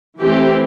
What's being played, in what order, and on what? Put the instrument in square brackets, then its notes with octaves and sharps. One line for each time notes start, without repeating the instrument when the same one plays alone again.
[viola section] E3 A3 C4 G4